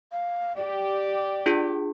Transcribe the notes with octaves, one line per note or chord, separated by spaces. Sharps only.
F5
G4 D5
D4 F4 G#4